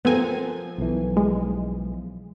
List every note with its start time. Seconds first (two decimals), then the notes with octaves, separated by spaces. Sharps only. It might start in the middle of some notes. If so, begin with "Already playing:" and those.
0.05 F3 B3 C4 A4 A#4 G#5
0.78 B1 E3
1.17 G#3